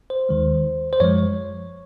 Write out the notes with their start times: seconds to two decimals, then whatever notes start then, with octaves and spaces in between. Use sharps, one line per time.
0.10 C5
0.29 D#2 D#3 G#3
0.93 C5
1.00 F#2 F3 G#3 C#5